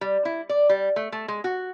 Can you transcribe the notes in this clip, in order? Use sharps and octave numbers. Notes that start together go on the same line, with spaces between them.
G3
E4
D5
G3
A3
A3
G#3
F#4